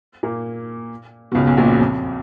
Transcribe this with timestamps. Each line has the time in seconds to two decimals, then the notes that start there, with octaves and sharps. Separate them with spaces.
0.23 A#2 A#3
1.32 B2
1.35 C#2 C#3
1.47 B1 B2
1.57 A#1 A#2
1.68 F#2
1.80 F2